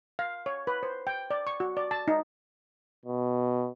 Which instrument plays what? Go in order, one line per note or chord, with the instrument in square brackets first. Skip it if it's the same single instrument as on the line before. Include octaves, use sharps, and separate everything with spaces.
[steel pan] F5
C#5
B4
C5
G5
D5
C#6
F#4
D5
A5
D#4
[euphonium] B2